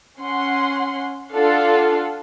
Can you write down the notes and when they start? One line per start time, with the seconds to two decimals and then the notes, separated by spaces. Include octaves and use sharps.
0.19 C#4 F#5 C6
1.33 D4 F4 A4 F5 F#5